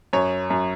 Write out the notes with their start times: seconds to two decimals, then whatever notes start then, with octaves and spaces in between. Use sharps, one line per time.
0.13 F#2 C#5
0.50 F#2